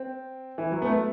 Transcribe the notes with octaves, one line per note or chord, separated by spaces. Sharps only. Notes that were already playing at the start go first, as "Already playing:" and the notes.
Already playing: C4
E3
F#3
B3
A3